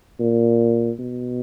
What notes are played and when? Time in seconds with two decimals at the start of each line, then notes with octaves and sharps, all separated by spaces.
0.20 A#2
0.99 B2